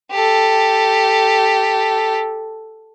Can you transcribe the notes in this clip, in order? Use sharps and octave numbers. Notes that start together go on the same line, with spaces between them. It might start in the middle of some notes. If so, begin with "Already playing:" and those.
G4 A4